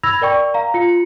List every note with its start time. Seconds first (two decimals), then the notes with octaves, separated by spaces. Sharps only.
0.03 B5 E6 G#6 A#6 F7
0.21 A#4 D5 G5 C#6
0.54 F5 A#5
0.74 F4 C#7